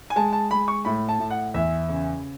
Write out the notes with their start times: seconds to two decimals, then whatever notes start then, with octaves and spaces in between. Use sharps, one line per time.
0.10 G#5
0.16 G#3 A5
0.33 A5
0.51 G#3 B5
0.68 C#6
0.85 A2 B5
1.09 A5
1.19 A2
1.30 F#5
1.54 E2 E5
1.89 C#3